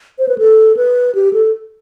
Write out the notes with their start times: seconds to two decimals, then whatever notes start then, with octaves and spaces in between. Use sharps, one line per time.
0.19 C5
0.28 B4
0.38 A4
0.77 B4
1.15 G4
1.33 A4